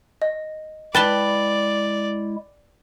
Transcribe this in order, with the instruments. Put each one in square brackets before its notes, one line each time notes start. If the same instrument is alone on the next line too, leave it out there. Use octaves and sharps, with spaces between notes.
[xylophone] D#5
[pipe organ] G#3 E4 [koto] B4 A5 [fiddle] D5 [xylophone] G5 A6 G7